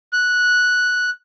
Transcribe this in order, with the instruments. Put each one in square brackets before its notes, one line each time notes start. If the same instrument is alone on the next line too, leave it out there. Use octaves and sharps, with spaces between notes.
[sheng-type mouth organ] F#6